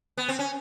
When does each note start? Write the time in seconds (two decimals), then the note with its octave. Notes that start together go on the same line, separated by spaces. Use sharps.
0.17 B3
0.29 C4
0.39 C#4